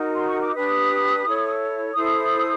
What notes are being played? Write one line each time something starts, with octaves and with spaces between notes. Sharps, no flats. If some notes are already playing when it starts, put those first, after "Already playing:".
Already playing: D#4 F#4 A#4
C6
C#6
D6
D4 G4 B4 D#6
E4 A4 C#5
E4 A4 C5 D#6